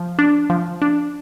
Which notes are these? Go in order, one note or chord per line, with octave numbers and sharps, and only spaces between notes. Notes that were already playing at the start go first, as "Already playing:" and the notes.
Already playing: F3
D4
F3
D4